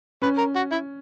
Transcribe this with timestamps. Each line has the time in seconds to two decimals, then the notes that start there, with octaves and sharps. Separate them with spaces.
0.22 C#4 B4
0.38 A#4
0.56 F#4
0.72 E4